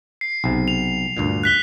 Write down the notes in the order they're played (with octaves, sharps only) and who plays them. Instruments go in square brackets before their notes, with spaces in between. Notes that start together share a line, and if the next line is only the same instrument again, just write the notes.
[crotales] C7
[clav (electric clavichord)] B1 C3
[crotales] F7
[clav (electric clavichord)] D2 G2 A#2
[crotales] F#6 B6 G7